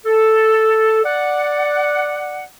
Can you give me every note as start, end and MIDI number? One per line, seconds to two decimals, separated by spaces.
0.06 1.04 69
1.05 2.44 74
1.05 2.44 78